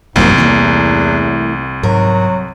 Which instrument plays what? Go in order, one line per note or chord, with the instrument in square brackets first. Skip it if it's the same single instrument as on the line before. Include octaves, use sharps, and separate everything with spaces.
[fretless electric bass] G1 F2 [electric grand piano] C2 [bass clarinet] G#2 [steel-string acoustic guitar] F#3 A3 A#3
[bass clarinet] E2 [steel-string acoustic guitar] E3 A3 [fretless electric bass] A#3
[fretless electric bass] G#2 [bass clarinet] F#3 [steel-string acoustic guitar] A#4